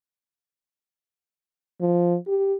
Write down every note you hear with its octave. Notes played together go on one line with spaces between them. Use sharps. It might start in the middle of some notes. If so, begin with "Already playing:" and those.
F3
G4